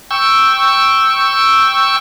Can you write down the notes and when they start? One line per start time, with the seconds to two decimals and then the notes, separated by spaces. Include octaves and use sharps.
0.11 G5 C#6 E6